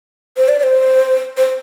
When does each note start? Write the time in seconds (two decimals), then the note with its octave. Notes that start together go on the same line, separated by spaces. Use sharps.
0.37 C5
0.48 D5
0.59 D5
0.63 C5
1.37 C5